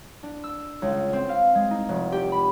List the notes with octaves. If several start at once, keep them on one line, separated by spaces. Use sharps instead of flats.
D4
E6
C#2
C4
F5
G#3
D#4
F1
G4
B5